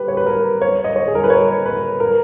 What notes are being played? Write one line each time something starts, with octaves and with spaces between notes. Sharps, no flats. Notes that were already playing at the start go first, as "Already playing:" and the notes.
Already playing: G4 B4
C#5
B4
A#4
C#5
D#5
C#5
G#4
A#4
B4
C#5
B4
A#4